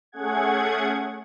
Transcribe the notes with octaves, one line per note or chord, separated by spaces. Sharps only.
A3 C#4 G#4 F#5 G#6